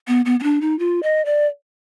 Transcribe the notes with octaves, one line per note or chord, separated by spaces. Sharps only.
B3
B3
B3
D4
D#4
F4
D#5
D5